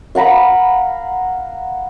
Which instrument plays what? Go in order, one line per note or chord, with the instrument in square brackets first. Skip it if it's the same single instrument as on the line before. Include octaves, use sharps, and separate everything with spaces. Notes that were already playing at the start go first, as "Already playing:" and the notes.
[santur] F5 F#5 A#5 B5